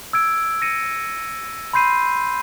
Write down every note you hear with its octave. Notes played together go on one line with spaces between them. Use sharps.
E6 G#6 D7
A#6 C#7 D#7
B5 C6 G6 C7 D#7